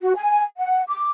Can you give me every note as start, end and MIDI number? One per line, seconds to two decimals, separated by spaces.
0.01 0.15 66
0.15 0.42 80
0.58 0.81 78
0.88 1.10 86